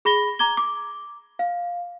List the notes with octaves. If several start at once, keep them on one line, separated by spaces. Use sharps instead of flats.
G#4 B5 A#6 G7
A#5 D6 G#6 G7
D6
F5